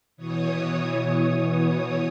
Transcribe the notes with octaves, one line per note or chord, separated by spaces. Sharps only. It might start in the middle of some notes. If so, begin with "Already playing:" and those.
B2 E3 C#5 D#6